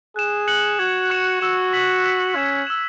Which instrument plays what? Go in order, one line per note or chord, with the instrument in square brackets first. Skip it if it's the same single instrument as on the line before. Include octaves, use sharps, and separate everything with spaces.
[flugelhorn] G#4 [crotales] F#6 E7
[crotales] F#6 C#7 F#7
[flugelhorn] F#4 [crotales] G#6 C#7 F#7
[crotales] C#6 F#6 C#7 E7
[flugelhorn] F#4 [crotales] E6 C#7 E7
[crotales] C#6 E6 B6 F#7
E6 B6 E7
[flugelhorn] C#4 [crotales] G#6 C#7 E7
[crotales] E6 G#6 E7